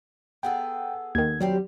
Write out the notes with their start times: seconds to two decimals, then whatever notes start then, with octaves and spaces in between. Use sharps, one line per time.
0.43 B3 G#4 A4 G5
1.15 D#2 D#3 G#6
1.41 F#3 G3 C4 G4